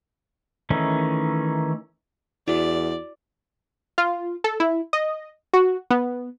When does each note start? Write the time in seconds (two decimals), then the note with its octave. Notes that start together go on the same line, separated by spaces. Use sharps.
0.70 D#3 E3 A3 C#4 D#4
2.48 E2 E4 F#4 D5
3.98 F4
4.44 A4
4.60 E4
4.93 D#5
5.53 F#4
5.90 B3